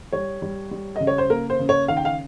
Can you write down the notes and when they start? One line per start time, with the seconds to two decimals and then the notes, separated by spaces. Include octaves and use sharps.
0.12 G3 C#5
0.42 G3
0.71 G3
0.96 C#3 D#5
1.07 C#5
1.18 C5
1.30 A#3 A#4
1.50 C5
1.59 C#3
1.69 C#5
1.88 D#3 F5
1.97 G5
2.05 F5